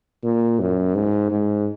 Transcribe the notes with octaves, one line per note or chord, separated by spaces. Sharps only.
A#2
F#2
G#2
G#2